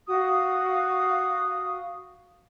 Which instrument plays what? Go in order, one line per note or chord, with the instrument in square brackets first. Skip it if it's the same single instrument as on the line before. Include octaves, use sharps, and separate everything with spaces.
[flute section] F#4 F5 D#6